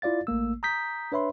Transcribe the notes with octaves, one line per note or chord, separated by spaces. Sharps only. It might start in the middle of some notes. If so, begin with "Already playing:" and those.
E4 F4 D5 F5 A6
A1 A3 A#3 E6
A#5 D#6 G6 B6
D4 B4 C#5 E5 B5 C6